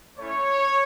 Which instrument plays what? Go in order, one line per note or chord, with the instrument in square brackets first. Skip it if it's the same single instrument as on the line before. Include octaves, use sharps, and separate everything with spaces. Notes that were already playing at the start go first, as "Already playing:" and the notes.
[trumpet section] A3 C#4 E4 C#5